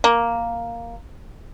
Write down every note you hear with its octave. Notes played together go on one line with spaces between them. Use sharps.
A#3